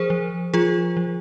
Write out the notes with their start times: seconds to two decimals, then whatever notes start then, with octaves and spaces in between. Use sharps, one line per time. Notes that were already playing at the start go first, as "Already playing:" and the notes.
Already playing: F3 G#4 A#4 C5
0.10 F3
0.54 F3 F4 G#4
0.97 F3